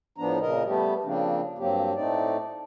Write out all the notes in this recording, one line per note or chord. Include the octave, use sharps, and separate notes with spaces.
A2 F3 B3 D4 A#5
A#2 C#3 A#4 D#5
G3 A3 B3 G4
C#3 F3 A#3 C4 D4
G2 F#3 A#3 C4 G4
A2 A3 C4 D#4 D5